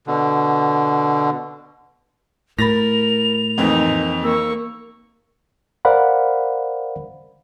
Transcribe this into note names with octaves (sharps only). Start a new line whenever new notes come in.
B2 D3
A2 A#4 B5 A6 A#6 F7
F2 E3 A#3 C4 D#4
A#3 C#6 E6
A#4 C5 D5 F5 F#5 B5